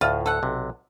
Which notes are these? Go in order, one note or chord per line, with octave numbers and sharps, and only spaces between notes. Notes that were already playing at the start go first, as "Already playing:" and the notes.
D2 A2 F4
A4 F#5
B1 C3